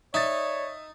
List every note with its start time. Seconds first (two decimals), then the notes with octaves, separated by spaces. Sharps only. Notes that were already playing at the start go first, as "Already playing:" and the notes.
0.14 D#4 C#5 D5 E5 A6